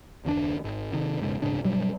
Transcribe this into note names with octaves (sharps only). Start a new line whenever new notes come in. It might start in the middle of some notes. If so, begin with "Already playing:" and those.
F#1 D#2 D3 D4
G#1
C3 D#3
E1 G#2 C#3
D#1 G#2 C#3 D4
G2 B2 F#3 G3